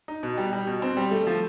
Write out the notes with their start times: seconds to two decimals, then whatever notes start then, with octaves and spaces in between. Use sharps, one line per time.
0.08 D#4
0.23 B2
0.38 G3
0.53 G3
0.67 B2
0.82 C4
0.97 G3
1.11 A3
1.27 F3